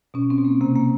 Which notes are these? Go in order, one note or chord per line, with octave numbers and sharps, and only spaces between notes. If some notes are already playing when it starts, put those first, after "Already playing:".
B2 C#4
C4
B2
A#3
C3 A#3
A#3